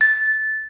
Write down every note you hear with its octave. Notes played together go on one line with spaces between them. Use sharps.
A6